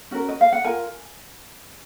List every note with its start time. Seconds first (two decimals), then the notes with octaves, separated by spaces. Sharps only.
0.11 C#4 F#4 A#4
0.29 D#5
0.41 F5
0.53 F#5
0.64 F4 A#4 G#5